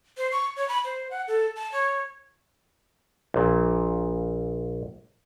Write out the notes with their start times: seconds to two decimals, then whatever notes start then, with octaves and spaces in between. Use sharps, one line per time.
0.17 C5
0.32 C#6
0.56 C#5
0.68 B5
0.85 C5
1.11 F#5
1.28 A4
1.56 A5
1.72 C#5
3.34 A#1 A#2